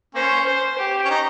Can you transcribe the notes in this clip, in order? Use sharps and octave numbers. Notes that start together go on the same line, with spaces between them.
A#3 C#4 C5
C5
G4
C#4
D#4